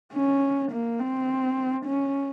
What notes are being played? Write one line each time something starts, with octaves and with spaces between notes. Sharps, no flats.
C#4
A#3
C4
C#4